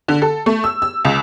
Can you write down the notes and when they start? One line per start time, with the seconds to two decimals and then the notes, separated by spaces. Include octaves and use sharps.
0.08 D3
0.22 A4
0.46 A3
0.64 E6
0.82 E6
1.05 C#2